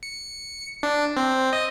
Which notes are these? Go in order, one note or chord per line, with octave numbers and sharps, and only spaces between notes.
C#7
D4
C4
D#5